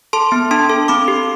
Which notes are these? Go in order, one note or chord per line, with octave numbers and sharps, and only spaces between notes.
A4 A5 C6
B3
D4 A5 C6
A4
C4 B5 D6
G4